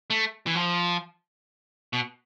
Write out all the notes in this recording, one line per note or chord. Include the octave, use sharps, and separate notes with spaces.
A3
E3
F3
B2